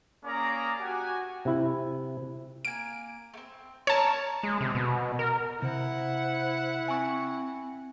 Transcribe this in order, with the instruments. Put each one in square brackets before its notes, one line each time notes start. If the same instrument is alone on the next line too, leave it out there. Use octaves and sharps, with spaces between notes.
[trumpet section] A#3 C#4 G#4 A#4 D5 A#5
F#4 G4 G#5
[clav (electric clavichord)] C3 E4
[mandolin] A#3 G#5 [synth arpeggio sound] D7
[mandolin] A3 C4
[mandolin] C4 C#4 A#4 [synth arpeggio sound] C#5 A5
[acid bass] G#3
C3
B2
A#4
[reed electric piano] C3 [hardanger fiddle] E4 F#5 [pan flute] C5
[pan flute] C4 [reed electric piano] G#5 C#6